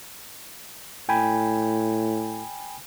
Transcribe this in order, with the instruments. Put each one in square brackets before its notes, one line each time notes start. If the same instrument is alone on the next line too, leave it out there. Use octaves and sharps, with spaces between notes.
[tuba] A2 [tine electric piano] G5 G#5 B5